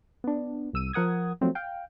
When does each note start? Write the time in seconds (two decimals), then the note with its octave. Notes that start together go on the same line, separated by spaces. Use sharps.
0.24 B3 D4
0.73 C2 E6 D#7
0.93 F3 A#4 F#5 D#6 G#6
1.41 F3 F#3 A3 C4
1.55 F5 G5